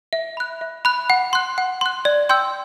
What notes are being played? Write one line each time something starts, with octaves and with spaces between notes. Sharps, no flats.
E5
B5 F#6
E5
B5 F#6
F#5
C6 F#6
F#5
C6 F#6
D5
G5 C6 E6 G6